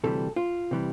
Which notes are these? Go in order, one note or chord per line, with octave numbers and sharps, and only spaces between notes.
D2 C3 E3 G3 A4
F4
C3 E3 G3